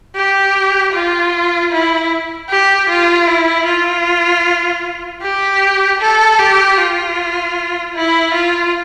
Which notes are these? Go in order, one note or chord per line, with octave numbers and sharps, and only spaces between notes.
G4
F4
E4
G4
F4
E4
F4
G4
A4
G4
F4
E4
F4